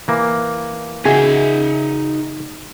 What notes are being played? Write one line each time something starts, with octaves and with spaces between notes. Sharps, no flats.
E3 A#3
C#3 D#4 F#4 G#4 D#5 E5